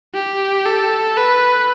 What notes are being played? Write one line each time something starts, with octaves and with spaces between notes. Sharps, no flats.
G4
A4
B4